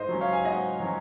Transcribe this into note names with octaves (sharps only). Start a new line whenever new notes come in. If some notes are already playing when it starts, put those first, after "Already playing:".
Already playing: G#2 C5 D#5
F#3 C#4
C#5 F5
G#5
G#2 D#5 F#5
F#3 C#4